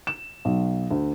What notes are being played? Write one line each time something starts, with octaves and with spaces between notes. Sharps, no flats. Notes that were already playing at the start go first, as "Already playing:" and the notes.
E7
B1
D2